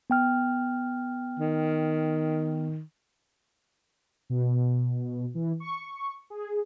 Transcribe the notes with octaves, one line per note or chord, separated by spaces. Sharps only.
B3 G5 F6
D#3
B2
E3
C#6
G#4